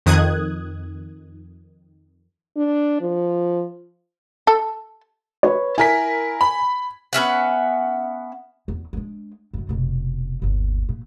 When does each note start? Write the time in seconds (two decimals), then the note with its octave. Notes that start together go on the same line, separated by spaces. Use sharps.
0.06 F2 D#3 D#6 F#6 G#6
2.57 D4
3.01 F3
4.47 A4
5.43 B4 C#5
5.78 E4 A#4 G#5 B6
6.41 B5
7.13 B3 C#4 E5 F#5
8.68 E2
8.93 G#3 D4
9.53 F#2 D3
9.69 F1 B2
10.42 G1 D#2
10.89 A#2